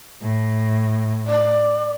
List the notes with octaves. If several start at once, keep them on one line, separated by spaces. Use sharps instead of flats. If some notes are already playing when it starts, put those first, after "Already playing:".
A2
D5